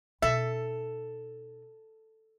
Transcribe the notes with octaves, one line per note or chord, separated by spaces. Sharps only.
B2 D#4 A4 E5